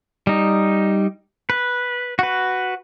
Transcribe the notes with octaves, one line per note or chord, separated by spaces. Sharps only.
G3 D#4
B4
F#4 B4